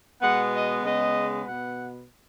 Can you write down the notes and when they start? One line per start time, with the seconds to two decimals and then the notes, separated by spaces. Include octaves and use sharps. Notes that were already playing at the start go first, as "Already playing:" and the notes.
0.21 B2 G#3 B3 F#5
0.52 D#5
0.83 C#3 G#3 B3 D#5
1.45 B2 B3 F#5